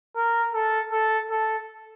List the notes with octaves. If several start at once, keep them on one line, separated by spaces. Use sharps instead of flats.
A#4
A4
A4
A4